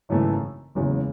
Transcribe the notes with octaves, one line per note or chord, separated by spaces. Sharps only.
G#1 F#2 C#3 E3 A3
F#1 E2 C#3 G#3